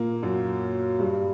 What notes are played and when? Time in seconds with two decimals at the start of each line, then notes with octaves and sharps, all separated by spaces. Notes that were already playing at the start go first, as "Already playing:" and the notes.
Already playing: A#2 A#3
0.22 F#2 F#3
0.99 G2 G3